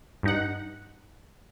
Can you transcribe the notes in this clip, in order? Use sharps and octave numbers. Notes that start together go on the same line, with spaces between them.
G2 D#4 F#5